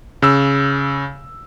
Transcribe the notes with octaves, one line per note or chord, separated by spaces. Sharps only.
C#3 E6